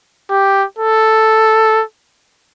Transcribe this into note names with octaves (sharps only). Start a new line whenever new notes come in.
G4
A4